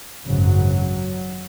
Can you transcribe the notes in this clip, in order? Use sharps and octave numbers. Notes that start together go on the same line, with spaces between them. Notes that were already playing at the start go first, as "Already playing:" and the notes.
G#1 F#2 C#3 F#3